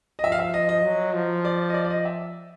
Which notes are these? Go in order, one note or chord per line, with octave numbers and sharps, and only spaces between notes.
D#5
F3 E5
F5
E5
D#5
D#5
F#3
F3
D5
D#5
D5
D5
D#5
E5